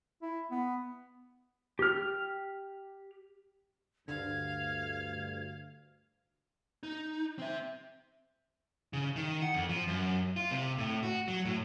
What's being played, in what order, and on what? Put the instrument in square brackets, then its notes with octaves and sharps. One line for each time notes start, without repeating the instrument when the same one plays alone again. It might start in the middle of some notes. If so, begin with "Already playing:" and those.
[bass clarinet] E4
B3
[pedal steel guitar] G4 F6
[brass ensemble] D2 G2 [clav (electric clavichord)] D3 [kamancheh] F5 [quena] G#6
[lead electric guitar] D#4
C4 E5
C#3
D#3
F#5
F2
F3
F#2
F4
C3
A2
F#4
F#3
A2